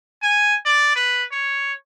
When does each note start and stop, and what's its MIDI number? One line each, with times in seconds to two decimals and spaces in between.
0.23 0.55 80
0.65 0.92 74
0.96 1.24 71
1.32 1.73 73